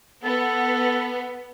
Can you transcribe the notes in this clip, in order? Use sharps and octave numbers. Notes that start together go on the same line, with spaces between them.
B3 A4